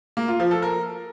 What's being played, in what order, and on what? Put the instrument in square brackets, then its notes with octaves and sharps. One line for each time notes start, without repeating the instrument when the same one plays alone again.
[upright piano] A#3
F4
F3
A4
A#4